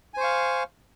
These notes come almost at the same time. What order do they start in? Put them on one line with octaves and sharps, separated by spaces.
G#5 C5 C#6 F5